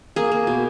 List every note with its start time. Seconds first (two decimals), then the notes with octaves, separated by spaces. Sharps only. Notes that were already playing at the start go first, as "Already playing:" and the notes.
0.16 A#3 G#4
0.32 A#3
0.47 B2